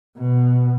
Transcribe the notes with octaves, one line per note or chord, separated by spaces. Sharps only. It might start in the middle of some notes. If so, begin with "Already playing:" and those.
B2